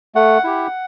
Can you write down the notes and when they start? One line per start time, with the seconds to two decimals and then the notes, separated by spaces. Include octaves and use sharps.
0.15 A3 F#5
0.44 E4 G4